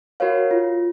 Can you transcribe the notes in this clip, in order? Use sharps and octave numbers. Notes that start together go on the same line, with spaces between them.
F#4 A#4 C#5 F5
F4